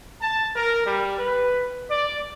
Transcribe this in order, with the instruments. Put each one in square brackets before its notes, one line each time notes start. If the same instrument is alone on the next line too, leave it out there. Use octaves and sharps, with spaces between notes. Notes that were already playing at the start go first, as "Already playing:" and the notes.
[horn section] A5
A#4
G3
B4
D5